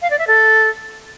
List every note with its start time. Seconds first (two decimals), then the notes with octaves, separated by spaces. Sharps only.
0.02 F5
0.10 D5
0.19 E5
0.27 A4